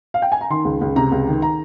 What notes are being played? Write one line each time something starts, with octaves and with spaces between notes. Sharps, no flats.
F5
G5
G#5
A#5
D#3 C6
C#2
C#2
C3 A#5
C#2
D#3
A#5